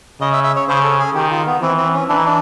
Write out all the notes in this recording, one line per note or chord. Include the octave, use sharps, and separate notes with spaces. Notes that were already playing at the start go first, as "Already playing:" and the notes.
C#3 D#5
E5
E5
C#5
C#3 C5
A4
G#4
D#3 G4
F4
B3
E3 C4
C4
C#4
E3 D4
D#4
D4